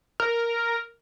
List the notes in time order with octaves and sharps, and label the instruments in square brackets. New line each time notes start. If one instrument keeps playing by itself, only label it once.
[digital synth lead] A#4